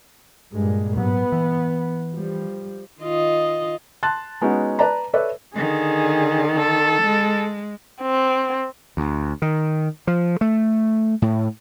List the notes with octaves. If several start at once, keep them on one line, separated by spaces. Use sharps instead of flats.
G2 A#2 G#3
G#2 F#3 B3
E3
F3 G3
D#3 F4 D#5
A5 C6 F#6 A6
G#3 B3 C#4 D#4 F#4
B4 D5 A5 A#5
A4 B4 C#5 D5 E5
D3 D#3 G#4
A4
G#3
C4
D2
D#3
F3
A3
A2